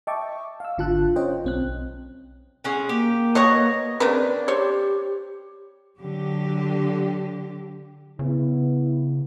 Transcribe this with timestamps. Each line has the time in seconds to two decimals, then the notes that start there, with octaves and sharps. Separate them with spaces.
0.07 D#5 E5 G5 A5 C#6 D6
0.60 F5 E6
0.78 G#1 D3 F4 A5 F#6
1.16 C#4 F4 C5 C#5 D#5 G5
1.44 B1 C4 F#6
2.64 G#3 C#4 F#5
2.89 A#3 G4
3.35 B2 C#5 D#5 C#6
4.00 C#3 C4 D4 A#4 B4
4.48 G4 C5 C#5
5.99 D3 F#3 G4
8.19 C#3 B3 E4